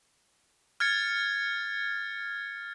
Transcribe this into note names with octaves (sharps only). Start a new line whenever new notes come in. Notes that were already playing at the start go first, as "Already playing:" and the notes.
F6 G#6 A6 C#7